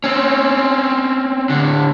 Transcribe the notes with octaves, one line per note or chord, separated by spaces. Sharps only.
C4 C#4
A2 D3